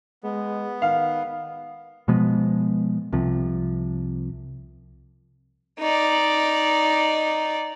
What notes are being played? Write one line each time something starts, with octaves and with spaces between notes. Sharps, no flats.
G#3 B3
D#3 F5
B2 F3 G#3 B3
C2 C3 F3
D#4 D5